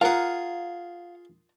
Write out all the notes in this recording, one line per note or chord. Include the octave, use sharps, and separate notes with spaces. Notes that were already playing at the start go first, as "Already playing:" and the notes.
F4 G#4 A#4 F5 F#5 A#5